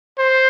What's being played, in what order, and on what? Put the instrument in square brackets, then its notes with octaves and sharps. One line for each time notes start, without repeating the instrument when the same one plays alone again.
[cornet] C5